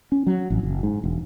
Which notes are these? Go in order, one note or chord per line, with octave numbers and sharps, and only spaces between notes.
C#4
F#3
A1
F#1
G#2
E1